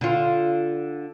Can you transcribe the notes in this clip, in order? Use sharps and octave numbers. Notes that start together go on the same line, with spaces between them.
D3 F4